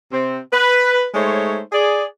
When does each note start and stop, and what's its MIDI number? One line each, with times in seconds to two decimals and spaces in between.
0.12 0.39 48
0.12 0.39 60
0.52 1.08 71
1.14 1.60 56
1.14 1.60 57
1.14 1.60 63
1.14 1.60 72
1.14 1.60 73
1.73 2.05 68
1.73 2.05 74